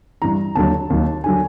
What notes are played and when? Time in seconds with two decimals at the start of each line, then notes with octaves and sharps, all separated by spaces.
0.22 G2 E3 A#5
0.55 D#2 D3 F#3 A5
0.90 D#2 D#3 F#3
1.24 D3 F#3 G#5